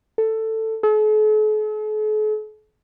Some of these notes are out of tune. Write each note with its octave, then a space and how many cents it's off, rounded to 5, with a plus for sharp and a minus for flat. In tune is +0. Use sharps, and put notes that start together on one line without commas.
A4 +10
A4 -45